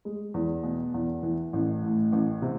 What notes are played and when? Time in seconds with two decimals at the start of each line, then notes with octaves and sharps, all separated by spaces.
0.05 G#3
0.34 E2
0.63 B2
0.94 E2
1.23 E3
1.53 A1
1.83 A2
2.13 A1
2.42 C3